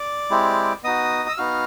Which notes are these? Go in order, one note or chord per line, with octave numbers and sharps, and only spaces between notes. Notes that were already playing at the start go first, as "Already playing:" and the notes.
Already playing: D5 D6
G#3 C4 E4 G4
B3 D#4 F#4 D#5 D#6
E6
B3 D#4 F#4 F5 F6